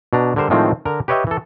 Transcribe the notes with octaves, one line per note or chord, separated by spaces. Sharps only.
B2 D4 A#5
D3 G3 A#4 C5
A2 D#3 F3 G#3 C4
D3 A#4 A#5
G4 B4 C#5 D#5 E5 G5
E3 A4